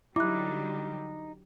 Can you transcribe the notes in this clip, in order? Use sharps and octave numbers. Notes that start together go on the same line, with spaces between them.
D3 F#3 G3 D#4 E4 D6 F#6